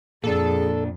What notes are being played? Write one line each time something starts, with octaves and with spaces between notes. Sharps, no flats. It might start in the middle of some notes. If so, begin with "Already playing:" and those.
F2 A#2 D4 G#4 A4